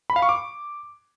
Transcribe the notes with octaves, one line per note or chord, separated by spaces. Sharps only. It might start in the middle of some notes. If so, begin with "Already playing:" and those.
B5
F5
C#6
D6